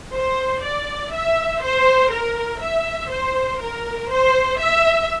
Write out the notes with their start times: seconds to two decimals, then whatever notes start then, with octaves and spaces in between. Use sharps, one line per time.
0.13 C5
0.63 D5
1.12 E5
1.62 C5
2.11 A#4
2.61 E5
3.11 C5
3.60 A#4
4.10 C5
4.59 E5